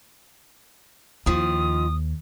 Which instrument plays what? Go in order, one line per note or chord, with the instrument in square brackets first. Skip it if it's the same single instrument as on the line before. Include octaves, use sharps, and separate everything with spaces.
[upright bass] D#2 [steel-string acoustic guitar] D#3 F3 [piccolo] D#6